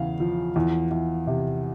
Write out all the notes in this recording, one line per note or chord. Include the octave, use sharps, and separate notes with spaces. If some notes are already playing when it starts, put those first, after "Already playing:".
Already playing: E2 C#3 F5
F3
E2
E2
C3